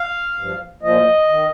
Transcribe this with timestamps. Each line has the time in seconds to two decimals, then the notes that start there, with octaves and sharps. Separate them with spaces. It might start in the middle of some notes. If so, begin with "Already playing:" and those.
Already playing: F5
0.36 G2
0.42 F3
0.82 A#2 F3 D#5
1.29 D#3